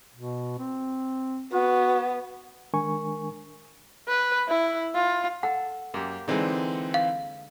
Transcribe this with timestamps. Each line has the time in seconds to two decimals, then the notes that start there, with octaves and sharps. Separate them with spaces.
0.16 B2
0.59 C4
1.53 B3 F#4
2.73 D#3 G#3 D4 A#4 G#5 C#6
4.08 B4
4.48 E4
4.95 F4
5.43 A4 F#5
5.94 F#2 A#3 G4
6.28 D3 E3 G#3 C4 D#4
6.94 F5